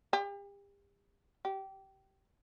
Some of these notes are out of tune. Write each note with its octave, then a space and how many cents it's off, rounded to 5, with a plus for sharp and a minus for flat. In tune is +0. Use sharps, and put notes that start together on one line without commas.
G4 +40
G4 -20